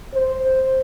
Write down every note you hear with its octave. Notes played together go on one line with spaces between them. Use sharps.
C5